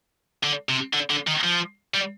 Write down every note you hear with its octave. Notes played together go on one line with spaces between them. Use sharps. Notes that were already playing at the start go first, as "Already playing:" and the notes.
D3
C3
D3
D3
D#3
F3
G3